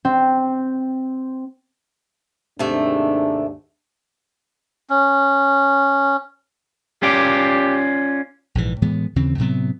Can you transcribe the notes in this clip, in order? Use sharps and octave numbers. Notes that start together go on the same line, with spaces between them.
C4
D#2 G#2 C3 A3 D4
C#4
C#4 F4 G4 D5
A#1 G#2 E3
A2 E3 G#3 B3
D#2 C#3 E3 C4
A2 C3 F#3 B3